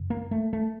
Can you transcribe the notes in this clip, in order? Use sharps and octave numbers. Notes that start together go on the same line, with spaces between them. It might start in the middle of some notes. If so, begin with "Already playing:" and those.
Already playing: F#2 C#3
A#3
A3
A3